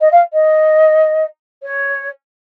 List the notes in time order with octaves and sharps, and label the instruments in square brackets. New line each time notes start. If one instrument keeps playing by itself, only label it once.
[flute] D#5
F5
D#5
C#5